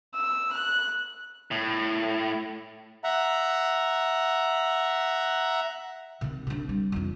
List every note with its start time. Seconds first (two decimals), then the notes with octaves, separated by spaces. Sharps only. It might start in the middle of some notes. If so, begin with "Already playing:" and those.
0.14 E6
0.53 F#6
1.51 A2
3.04 E5 F#5 A#5
6.21 C3 D#3
6.47 C3 D4
6.69 G3
6.92 F1 E2